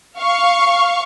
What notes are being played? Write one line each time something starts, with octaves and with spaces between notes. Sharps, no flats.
F5 C#6